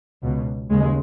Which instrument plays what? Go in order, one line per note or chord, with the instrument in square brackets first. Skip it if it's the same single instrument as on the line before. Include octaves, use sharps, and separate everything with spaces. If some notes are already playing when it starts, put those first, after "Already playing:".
[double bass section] C#2 B2
D#2 C#3 G#3